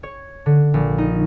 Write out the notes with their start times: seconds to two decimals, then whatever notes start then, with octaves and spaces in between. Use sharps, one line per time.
0.03 C#5
0.46 D3
0.74 A#1
0.98 D#4